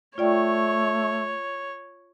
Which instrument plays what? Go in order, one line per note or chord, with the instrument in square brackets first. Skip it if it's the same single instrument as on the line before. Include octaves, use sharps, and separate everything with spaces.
[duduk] A3 [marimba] F4 D5 G5 [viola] C#5